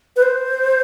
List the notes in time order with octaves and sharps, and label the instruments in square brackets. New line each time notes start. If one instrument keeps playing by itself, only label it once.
[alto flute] B4
C5